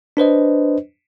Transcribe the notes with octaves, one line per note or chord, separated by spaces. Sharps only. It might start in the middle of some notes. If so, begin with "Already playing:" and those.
D4 B4 C5 D#5